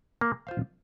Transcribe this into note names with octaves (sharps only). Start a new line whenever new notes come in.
A#3
F4 C5 F5